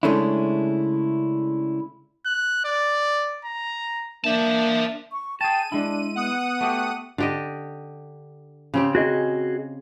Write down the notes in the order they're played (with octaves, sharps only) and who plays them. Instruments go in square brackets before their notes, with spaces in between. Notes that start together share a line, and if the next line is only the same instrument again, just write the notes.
[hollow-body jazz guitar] C#3 G#3 A3 C#4 D4 E4
[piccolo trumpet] F#6
D5
A#5
[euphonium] A#3 [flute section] D4 E5 [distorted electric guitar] C5 A5
[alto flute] C#6
[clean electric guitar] G#4 A5 [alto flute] G5 [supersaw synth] D#7
[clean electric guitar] G#3 E4 [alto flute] D4
[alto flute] B3 [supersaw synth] F#5 D#6 D#7
[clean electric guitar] A3 F#4 G4
[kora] D3 G4 D#5
C#3 C4 G4
[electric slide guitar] F#4 G#4 D#5